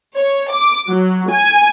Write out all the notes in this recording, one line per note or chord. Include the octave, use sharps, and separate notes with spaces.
C#5
D6
F#3
G#5